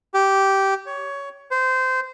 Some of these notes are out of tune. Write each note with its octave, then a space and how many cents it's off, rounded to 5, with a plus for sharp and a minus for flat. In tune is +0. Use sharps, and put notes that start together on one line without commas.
G4 -10
C#5 +15
C5 -20